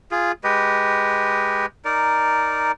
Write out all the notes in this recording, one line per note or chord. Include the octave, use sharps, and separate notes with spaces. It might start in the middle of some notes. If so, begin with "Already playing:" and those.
F4 G#4
G#3 G4 B4 D#5
D#4 A#4 D5